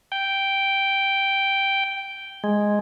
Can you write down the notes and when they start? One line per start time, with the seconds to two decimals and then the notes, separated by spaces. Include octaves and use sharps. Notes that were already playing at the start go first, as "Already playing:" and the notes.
0.12 G5
2.44 G#3